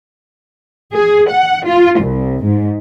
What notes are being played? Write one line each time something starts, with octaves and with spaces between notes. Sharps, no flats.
G#4
F#5
F4
C2
G#2